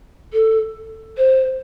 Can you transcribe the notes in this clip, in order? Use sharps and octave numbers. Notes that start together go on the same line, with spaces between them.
A4
C5